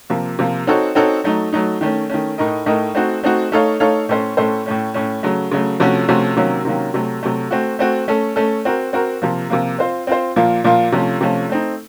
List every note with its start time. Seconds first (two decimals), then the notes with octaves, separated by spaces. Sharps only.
0.10 C3 F3 A#3
0.39 C3 F3 A#3
0.67 C4 D#4 F#4 A4 C#5
0.95 C4 D#4 F#4 A4 C#5
1.24 F#3 A3 D#4
1.53 F#3 A3 D#4
1.81 D#3 A3 C#4
2.10 D#3 A3 C#4
2.38 A2 A3 D#4 A#4 D#5
2.66 A2 A3 D#4 A#4 D#5
2.95 A3 C4 D#4 F#4
3.23 A3 C4 D#4 F#4
3.52 A3 D#4 A4 C#5 F5
3.80 A3 D#4 A4 C#5 F5
4.09 A2 A3 C#4 A4 C5
4.37 A2 A3 C#4 A4 C5
4.66 A2 A3 C#4
4.94 A2 A3 C#4
5.23 C#3 F#3 A3
5.52 C#3 F#3 A3
5.80 C3 F3 A3 C#4 F#4
6.08 C3 F3 A3 C#4 F#4
6.37 C3 D#3 F#3 A#3 C#4
6.65 C3 D#3 F#3 A#3 C#4
6.94 C3 F#3 A3
7.23 C3 F#3 A3
7.51 A3 C4 F#4
7.79 A3 C4 F#4
8.08 A3 C#4 A4
8.36 A3 C#4 A4
8.65 C4 F#4 A#4
8.93 C4 F#4 A#4
9.22 C3 F3 A#3
9.50 C3 F3 A#3
9.78 C4 F4 C5
10.07 C4 F4 C5
10.36 A#2 F3 A#3 F4
10.64 A#2 F3 A#3 F4
10.92 C3 F3 A3 C#4 F4
11.21 C3 F3 A3 C#4 F4
11.49 A3 C4 D#4